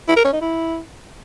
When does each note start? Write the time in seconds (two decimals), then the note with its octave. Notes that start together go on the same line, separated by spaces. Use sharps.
0.08 E4
0.16 A#4
0.25 C#4
0.33 D#4
0.41 E4